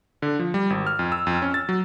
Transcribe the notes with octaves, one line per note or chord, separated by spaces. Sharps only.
D3
F3
G3
G#1
F6
F2
E6
F2
C#4
A6
F#3